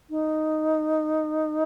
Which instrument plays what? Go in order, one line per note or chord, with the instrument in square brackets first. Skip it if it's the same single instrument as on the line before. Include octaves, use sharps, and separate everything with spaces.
[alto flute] D#4